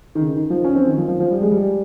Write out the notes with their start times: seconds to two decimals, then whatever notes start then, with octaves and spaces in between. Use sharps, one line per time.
0.15 D#3
0.21 C#3
0.36 D#3
0.50 F3
0.64 C#4
0.75 C4
0.86 D#3
0.98 F3
1.08 F3
1.20 F3
1.30 G3
1.41 G#3
1.52 G3